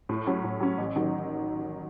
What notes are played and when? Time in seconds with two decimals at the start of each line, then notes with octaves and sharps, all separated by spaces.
0.09 A2
0.27 F#3 C#4
0.44 A2
0.60 F#3 C#4
0.78 A1
0.96 D#3 F#3